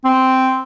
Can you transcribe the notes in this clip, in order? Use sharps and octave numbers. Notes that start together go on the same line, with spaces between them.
C4